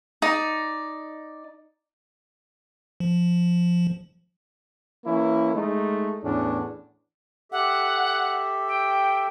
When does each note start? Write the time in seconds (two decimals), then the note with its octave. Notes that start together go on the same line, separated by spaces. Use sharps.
0.22 D#4 D5
3.00 F3
5.05 E3 A#3 C#4 E4
5.54 G#3 A3 D#4
6.23 E2 A2 C#4 D4
7.52 G4 A4 E5 F#5
8.68 G5